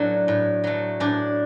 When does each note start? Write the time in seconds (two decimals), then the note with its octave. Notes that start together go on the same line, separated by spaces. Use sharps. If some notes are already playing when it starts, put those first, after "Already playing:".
Already playing: A2 F#3 A3 D4
0.28 A2
0.64 F#3 A3
1.00 A2 D4